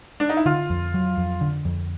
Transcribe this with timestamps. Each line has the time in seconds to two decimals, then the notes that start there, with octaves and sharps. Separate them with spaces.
0.20 D4
0.29 D#4
0.37 E4
0.46 D3 F4
0.70 F2
0.94 F#3
1.17 F2
1.41 D3
1.65 F2